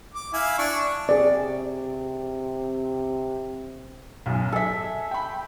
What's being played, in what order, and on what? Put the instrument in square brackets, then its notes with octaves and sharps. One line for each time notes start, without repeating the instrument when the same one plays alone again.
[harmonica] D6
E4 F5 G#5
D4 C#6
[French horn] C3 [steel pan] G#4 D5
[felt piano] B1 F#2
[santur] A4 E5 [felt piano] G#5 B6
[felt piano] G5 B5